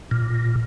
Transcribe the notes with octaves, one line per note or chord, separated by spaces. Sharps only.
A#2